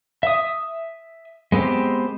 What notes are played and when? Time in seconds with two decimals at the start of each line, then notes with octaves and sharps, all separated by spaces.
0.23 E5 D#6
1.52 G#3 B3 C4 G4